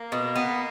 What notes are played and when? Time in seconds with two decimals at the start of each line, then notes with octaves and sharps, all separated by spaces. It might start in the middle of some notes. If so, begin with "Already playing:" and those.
Already playing: A#3
0.12 B2
0.36 B3